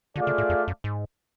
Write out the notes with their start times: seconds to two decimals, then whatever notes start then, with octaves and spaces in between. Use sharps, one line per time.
0.15 D3 A3 F4 G#4 D5 F5
0.27 C#3
0.38 A2
0.49 F2
0.68 F#2
0.84 G#2